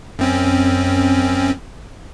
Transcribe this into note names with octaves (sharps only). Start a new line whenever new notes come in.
F#2 C4 C#4